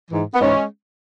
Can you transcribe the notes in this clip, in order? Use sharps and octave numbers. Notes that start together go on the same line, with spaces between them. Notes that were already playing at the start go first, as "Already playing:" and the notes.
G#2 E3
B3
G#2 E3 G#3 C#4